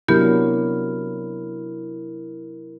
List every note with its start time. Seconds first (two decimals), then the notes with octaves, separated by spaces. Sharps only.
0.08 C3 F#3 B3 D4 E4 G4 A#4